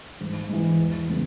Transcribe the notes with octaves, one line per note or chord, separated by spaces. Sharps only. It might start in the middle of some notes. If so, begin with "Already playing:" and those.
G#2
E3 G#3
E2
C#3 G#3 B3